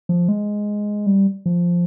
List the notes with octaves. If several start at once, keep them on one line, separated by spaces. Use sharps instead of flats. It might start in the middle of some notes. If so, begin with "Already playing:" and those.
F3
G#3
G3
F3